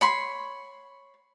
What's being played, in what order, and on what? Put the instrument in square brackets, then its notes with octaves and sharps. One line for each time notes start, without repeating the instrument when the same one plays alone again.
[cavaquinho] C#5 B5 C6